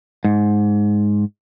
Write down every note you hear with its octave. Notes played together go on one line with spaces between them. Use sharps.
G#2